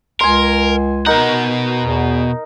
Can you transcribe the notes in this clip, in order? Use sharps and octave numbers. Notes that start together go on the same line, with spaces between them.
C#2 A#4 G#5 C6
B2 D#4 A#4 F#5
E2